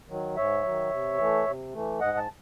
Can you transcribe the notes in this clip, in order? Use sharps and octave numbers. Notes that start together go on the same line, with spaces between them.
D#3 F#3
G#2 C#5 E5
D#3 F#3
C3
E3 A3
C3
E3 A3
G#2 D#5 F#5
A5